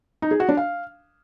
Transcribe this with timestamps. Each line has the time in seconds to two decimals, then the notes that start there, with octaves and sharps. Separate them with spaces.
0.22 D#4
0.31 G#4
0.40 F#4
0.49 D4
0.57 F5